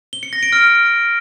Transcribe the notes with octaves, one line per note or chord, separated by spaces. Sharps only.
G7
C#7
A#6
D7
F6